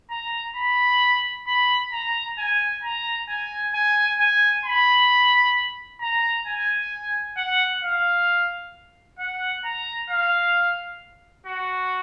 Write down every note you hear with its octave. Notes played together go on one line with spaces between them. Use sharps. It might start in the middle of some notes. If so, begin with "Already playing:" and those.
A#5
B5
B5
A#5
G#5
A#5
G#5
G#5
G#5
B5
A#5
G#5
F#5
F5
F#5
A#5
F5
F#4